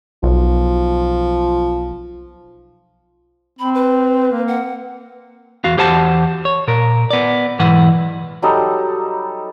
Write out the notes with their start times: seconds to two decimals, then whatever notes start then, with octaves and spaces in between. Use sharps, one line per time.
0.23 B1 F3
3.59 C4 B5
3.75 B4
4.32 A#3
4.48 F#5
5.64 E2 F#4 F5
5.77 E2 G4 C5 F#5 A5
6.45 C#5
6.68 A#2 A#4
7.11 B3 D5
7.59 B1 G#2 E3 B4 F#5
8.42 F#3 G3 D#4 A4